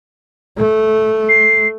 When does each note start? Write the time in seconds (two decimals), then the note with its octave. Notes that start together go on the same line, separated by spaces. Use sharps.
0.57 A3
1.29 C7